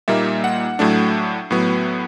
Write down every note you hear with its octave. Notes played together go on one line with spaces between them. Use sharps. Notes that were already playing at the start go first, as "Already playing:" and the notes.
A#2 G3 A#3 D#4 E5
F#5
A2 F#3 A3 D4
A2 F#3 B3